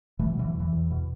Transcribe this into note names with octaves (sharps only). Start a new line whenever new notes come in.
B2 E3 A3
F#3
B2 E3
F#3
E2 E3
E2
B2